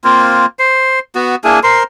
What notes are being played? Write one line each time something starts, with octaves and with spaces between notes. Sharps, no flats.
A#3 C4 F4
C5
B3 F#4
A#3 D4 E4 G#4
A#4 C5 C6